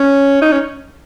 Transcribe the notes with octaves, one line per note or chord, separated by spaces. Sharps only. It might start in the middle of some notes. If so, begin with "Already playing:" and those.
Already playing: C#4
D#4
C#4